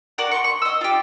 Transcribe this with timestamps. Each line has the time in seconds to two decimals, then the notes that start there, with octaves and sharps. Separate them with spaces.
0.18 F#4 A#4 D5 F#5
0.31 C6 C#6
0.44 C#6
0.62 D#5 E6
0.81 F4 G4